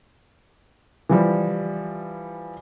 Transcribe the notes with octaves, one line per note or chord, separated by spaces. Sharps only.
E3 F3 G3